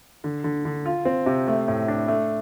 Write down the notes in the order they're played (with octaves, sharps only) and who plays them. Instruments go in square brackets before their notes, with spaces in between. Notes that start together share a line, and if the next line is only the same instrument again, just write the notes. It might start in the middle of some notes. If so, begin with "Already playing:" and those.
[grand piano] D3
D3
D3
F4
C4
C3
A3
A2
D4
A3